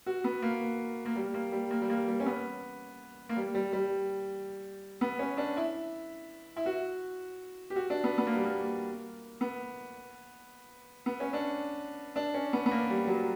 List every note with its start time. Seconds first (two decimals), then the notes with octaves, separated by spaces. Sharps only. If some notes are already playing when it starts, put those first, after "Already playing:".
0.06 F#4
0.24 B3
0.42 A#3
1.05 A#3
1.16 G3
1.34 A#3
1.52 G3
1.71 A#3
1.82 G3
1.90 A#3
2.08 G3
2.20 C#4
2.26 B3
3.29 A#3
3.36 G3
3.55 G3
3.73 G3
5.01 B3
5.19 C#4
5.37 D4
5.57 E4
6.56 E4
6.66 F#4
7.70 G4
7.76 F#4
7.90 D4
8.04 B3
8.18 B3
8.27 A#3
8.36 G3
8.45 A#3
9.41 B3
11.06 B3
11.20 C#4
11.33 D4
12.16 D4
12.34 C#4
12.53 B3
12.66 B3
12.71 A#3
12.90 G3
13.07 F#3